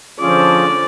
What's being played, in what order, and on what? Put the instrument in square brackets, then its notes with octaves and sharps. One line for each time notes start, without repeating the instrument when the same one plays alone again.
[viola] D3 D5 [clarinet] F3 [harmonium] C#4 F4 G#4